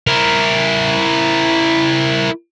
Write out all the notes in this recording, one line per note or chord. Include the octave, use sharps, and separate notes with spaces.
E4 A#4